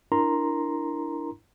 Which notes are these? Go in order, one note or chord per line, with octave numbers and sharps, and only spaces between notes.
D4 E4 A#4 A#5 C6